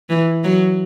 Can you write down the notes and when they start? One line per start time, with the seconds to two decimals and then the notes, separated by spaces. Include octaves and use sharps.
0.10 E3
0.44 F#3